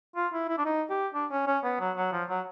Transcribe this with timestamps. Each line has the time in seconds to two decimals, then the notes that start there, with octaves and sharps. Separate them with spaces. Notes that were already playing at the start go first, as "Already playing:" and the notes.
0.16 F4
0.33 E4
0.49 E4
0.58 D4
0.65 D#4
0.90 G4
1.14 D4
1.31 C#4
1.47 C#4
1.64 B3
1.80 F#3
1.97 F#3
2.13 F3
2.29 F#3